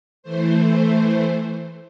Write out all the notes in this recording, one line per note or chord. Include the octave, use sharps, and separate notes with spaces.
E3 A3 C5